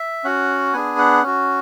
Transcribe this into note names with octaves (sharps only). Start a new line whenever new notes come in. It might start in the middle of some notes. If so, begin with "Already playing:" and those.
Already playing: E5
C#4 F#4 F#5
B3 D4 G#4 G#5
F#5
C#4 F#4